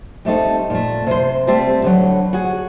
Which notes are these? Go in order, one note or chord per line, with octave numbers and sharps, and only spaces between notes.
G3 A3 C4 D#4 A4
A#2 A3
C3 C5
G3 A3 C4 C5 D5 E5
A2 D3 E3 F#3
F#4 G#4